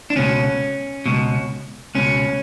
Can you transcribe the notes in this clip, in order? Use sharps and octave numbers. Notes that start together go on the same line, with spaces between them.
D4
C#2 B2 C#4
C#2 B2
C#2 B2 C#4